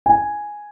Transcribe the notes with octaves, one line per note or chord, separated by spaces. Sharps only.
G#5